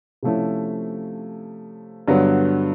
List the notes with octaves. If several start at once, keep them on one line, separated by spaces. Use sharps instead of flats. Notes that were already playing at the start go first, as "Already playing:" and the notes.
C3 F3 A3 C#4 E4
G2 D3 F#3 B3